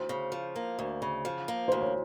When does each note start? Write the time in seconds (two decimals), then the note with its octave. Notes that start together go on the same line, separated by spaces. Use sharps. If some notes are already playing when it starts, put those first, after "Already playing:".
Already playing: D2 C5
0.09 C#3
0.32 F3
0.56 A#3
0.79 D2
1.02 C#3
1.25 F3
1.48 A#3
1.68 D2 C5
1.81 C#5